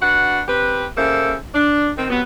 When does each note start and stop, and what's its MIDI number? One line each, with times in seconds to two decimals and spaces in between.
0.01 0.40 62
0.01 0.40 66
0.01 0.40 71
0.01 0.40 78
0.48 0.85 60
0.48 0.85 67
0.48 0.85 71
0.97 1.34 49
0.97 1.34 58
0.97 1.34 69
0.97 1.34 72
0.97 1.34 76
1.54 1.89 62
1.97 2.05 51
1.97 2.05 60
2.10 2.21 48
2.10 2.21 54
2.10 2.21 59